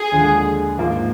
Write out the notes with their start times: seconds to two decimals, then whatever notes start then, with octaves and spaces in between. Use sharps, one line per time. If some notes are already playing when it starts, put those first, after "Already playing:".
Already playing: G#4
0.12 D#2 D3 F3 G#3
0.78 G#2 F3 A#3